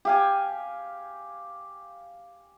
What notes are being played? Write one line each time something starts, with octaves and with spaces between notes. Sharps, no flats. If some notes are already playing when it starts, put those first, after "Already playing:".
G4 F5 G#5